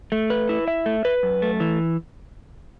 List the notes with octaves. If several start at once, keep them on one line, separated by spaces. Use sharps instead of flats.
A3
B4
E4
E5
A3
B4
F#2
A3
E3